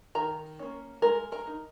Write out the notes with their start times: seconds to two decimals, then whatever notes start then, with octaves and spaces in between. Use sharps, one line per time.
0.15 D#3 A#4 A#5
0.59 A#3 C#4
1.02 G#3 A#4 A#5
1.32 A#4 A#5
1.47 D#4